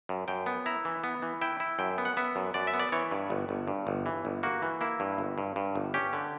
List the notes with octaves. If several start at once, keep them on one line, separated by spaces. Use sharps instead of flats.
F#2
F#2 G5
B3
E4 A#5
E3
B3
E3
E4 G5
E4
F#2 G5
B3
F#5
B3 E5
F#2
F#2 D5
E5
B3
D5
E3 C#5
G2
G1
G1
G2
G1
E3
G1
A#3 F#4
E3
A#3 E4
G2
G1
G2
G2
G1
C#4 G4
D3